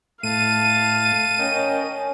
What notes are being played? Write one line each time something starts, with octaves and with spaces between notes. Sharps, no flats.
A2 A3 F5 A5 D#7
C#4 A#4 D#5 G5